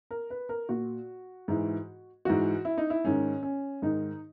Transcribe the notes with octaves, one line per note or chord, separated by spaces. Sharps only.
A#4
B4
A#4
A#2 F#4
G#2 E3
G#2 E3 F#4
E4
D#4
E4
G#2 D#3 C#4
C#4
G#2 D#3 D#4